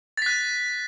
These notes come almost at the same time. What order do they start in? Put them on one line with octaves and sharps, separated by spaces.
A6 B6 F#6